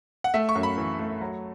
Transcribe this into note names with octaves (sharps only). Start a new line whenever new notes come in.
F#5
A3 E5
C#6
F#2
B5
E3
A3
F#3